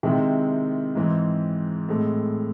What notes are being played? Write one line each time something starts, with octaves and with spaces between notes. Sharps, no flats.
C3 D#3 G#3 C4 E4
G#2 E3 C4
A2 G#3 C4